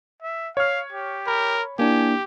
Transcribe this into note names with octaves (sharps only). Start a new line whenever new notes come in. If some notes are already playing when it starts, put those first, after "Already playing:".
E5
C#5 F5 F6
G4
A#4 B5
A#3 D4 E4 G4 G#5